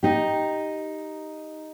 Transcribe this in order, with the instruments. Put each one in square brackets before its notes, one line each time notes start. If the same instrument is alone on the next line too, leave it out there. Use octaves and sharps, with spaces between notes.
[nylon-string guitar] D#4 G4